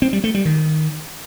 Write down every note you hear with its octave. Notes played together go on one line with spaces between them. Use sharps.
C4
G3
A3
G3
D#3